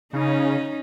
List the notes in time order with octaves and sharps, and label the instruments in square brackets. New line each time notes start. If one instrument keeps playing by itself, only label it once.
[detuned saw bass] C#3 [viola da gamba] C#4 D#4